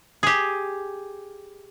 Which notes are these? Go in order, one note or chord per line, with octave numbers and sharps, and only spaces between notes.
G4 G#4